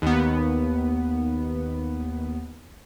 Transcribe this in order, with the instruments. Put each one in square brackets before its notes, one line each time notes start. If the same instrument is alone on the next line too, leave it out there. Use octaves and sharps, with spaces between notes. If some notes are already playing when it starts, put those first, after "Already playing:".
[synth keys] D#2 B3